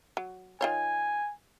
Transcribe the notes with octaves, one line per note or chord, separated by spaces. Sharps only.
F#3
D#3 F4 C#5 G#5